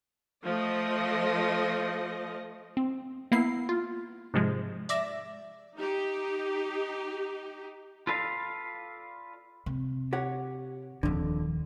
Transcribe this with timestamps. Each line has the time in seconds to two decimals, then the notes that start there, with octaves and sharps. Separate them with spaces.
0.44 F3 A3 D#5
2.77 C4
3.32 A#3 B3 E4 C7
3.69 F4
4.34 G#2 C3 F3 G#3
4.89 D5 E5 D6 A#6
5.77 D#4 G4
8.07 F4 A4 B4 D5 F5
9.66 C3
10.13 G4 C#5 F#5
11.03 D#1 F2 D3 D#3